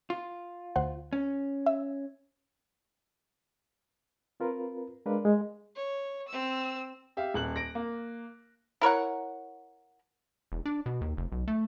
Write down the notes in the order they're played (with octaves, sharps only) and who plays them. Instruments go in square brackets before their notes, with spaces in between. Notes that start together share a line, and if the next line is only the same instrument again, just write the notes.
[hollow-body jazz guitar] F4
[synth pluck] D2 C5 F#5
[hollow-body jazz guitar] C#4
[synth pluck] E5
[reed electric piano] C4 F4 A#4 B4
G#3 D4 A#4 B4 D5 F5
G#3
[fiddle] C#5
C4 E6
[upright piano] G4 E5 F5
D#1 F#6 F#7
A#6 D7
A#3
[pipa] E4 A#4 C#5 F#5
[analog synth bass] E1
D4
B2
D#2
F1
B1
A3